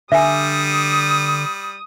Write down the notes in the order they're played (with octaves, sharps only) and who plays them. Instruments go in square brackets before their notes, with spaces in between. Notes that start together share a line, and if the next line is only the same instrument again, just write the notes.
[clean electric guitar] D3 [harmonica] G3 [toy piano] E5 G#5 [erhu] D#6